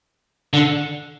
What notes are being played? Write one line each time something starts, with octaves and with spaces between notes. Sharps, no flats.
D3